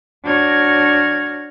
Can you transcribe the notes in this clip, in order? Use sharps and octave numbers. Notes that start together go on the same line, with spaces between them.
D4 F#4 C#5 F6 G#6 A#6